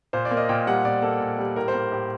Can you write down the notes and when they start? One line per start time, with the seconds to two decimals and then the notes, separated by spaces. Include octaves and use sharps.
0.13 A#2 C5
0.25 D5
0.31 A#3
0.37 D#5
0.49 A#2 G5
0.67 G3 F#5
0.84 A#2 D5
1.02 A#3 A4
1.20 A#2
1.38 G3
1.56 A2 A#4
1.68 C5
1.74 A#3
1.92 A2 G4